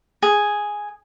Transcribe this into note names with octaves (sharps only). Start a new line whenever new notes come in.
G#4